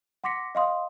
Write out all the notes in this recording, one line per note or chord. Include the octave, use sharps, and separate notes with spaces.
F#5 C6 D6 A#6 B6 C#7
D#5 F5 C6 D#6